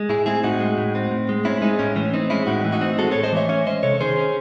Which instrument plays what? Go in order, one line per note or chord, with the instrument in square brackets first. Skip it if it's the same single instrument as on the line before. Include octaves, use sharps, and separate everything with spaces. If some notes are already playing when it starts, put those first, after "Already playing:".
Already playing: [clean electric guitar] G#3
A2 E4 G#4
C4 E4 G#4
A2 D#4 F#4
G#3
A2
C4
A2
G#3
C4 C#4 E4
G#3 D#4
A2 C#4
E3 C#4
C4 D#4
G#3 C#4 E4
A2 D#4 F#4
E3
D#4 F#4
C4
G#3 F#4 A4
A2 A4 C#5
C5 D#5
E3 C#5 E5
C#4 C#5 E5
G#3 C5 D#5
C3 A4 C#5
D#3 G#4 C5
C#4